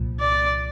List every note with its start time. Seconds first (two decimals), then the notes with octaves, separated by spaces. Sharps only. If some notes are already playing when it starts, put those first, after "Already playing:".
Already playing: C2 A#2 F3
0.20 D5